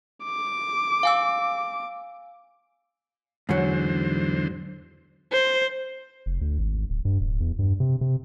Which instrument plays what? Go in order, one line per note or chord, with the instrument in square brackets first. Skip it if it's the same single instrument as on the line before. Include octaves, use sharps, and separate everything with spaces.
[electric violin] D6
[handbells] F5 G#5 E6
[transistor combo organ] E2 D3 C5 [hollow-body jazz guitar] G#2 F#3
[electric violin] C5
[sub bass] F1
D2
G#1
D1
G2
D1
E2
G2
C3
C3